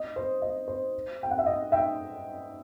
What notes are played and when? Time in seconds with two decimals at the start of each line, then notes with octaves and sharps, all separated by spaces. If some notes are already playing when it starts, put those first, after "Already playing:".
Already playing: D#5
0.16 C5
0.42 D#5
0.68 C5
1.23 G5
1.31 F#5
1.39 E5
1.46 D#5
1.72 E5 G5